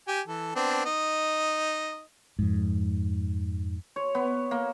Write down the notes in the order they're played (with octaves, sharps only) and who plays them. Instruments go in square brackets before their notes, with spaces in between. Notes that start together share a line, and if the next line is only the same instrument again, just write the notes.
[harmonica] G4 G#5
E3 A4
B3 C4 D4
D#4 D#5
[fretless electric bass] F2 G#2
[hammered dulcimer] C#5
B3
A#3